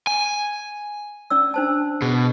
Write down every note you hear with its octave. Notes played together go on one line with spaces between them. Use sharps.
G#5
C#4 D5 E6
D4 C5 A5
B2 G#4